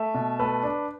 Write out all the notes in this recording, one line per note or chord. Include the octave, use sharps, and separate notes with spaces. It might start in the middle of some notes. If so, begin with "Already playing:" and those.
Already playing: A3 E5
B2
A3 B4
D4